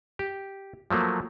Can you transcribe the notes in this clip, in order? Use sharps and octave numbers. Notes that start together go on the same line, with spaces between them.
G4
F3 F#3 A3 A#3